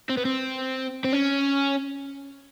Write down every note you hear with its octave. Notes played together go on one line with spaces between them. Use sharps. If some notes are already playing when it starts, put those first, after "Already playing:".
C4
B3
C4
C4
C#4